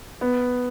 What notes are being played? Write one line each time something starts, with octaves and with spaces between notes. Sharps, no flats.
B3